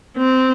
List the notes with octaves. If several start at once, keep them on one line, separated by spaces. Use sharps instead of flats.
C4